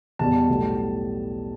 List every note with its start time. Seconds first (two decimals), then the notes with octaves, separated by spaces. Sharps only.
0.19 E2 B2 G3 A5
0.49 B1 A2 G3